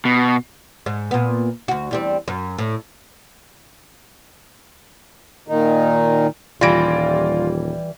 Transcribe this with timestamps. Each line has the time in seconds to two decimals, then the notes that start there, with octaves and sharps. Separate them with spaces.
0.05 B2
0.86 G#2
1.11 A#2 B3
1.68 D2 F#4
1.91 E2 G3 C4
2.28 F#2
2.58 A2
5.48 A#2 D#3 D#4
6.61 D#1 E3 G3 F4 D5 A#6 D7